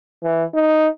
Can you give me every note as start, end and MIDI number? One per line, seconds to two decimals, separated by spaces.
0.24 0.45 52
0.55 0.88 63